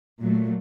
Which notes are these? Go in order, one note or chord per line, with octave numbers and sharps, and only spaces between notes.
A#2 F#3 A3